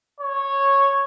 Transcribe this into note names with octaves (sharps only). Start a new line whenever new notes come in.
C#5